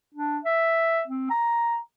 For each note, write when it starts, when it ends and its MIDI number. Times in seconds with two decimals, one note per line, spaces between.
0.14 0.38 62
0.44 1.03 76
1.08 1.26 60
1.30 1.76 82